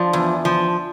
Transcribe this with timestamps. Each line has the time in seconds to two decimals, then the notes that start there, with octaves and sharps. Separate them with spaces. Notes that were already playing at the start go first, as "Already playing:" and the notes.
Already playing: F3 D4
0.13 E2
0.45 F3